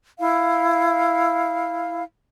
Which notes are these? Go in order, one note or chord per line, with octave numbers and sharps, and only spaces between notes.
E4 F5